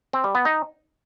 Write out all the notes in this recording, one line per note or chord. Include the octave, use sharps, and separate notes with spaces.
C4
G3
B3
D#4